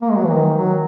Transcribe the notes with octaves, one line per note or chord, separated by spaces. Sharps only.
A#3
G#3
F#3
E3
D#3
F#3